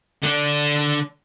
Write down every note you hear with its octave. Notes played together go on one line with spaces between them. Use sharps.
D3 D4